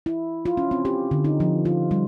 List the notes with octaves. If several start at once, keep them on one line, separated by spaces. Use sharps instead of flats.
E4
F4
C#4
C4
G4
D3
D#4
F3
F4
G3